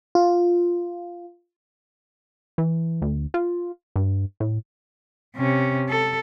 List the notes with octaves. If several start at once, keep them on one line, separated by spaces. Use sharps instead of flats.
F4
E3
D2
F4
G2
A2
C3 C#4
A4